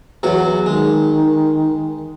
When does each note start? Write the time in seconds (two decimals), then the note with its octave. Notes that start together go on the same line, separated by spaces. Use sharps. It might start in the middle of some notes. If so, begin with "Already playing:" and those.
0.23 E2 F#3 F#4
0.66 D#3 G#3